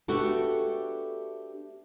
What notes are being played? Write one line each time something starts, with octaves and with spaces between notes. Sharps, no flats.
A3 B3 D4 F#4 G4 A4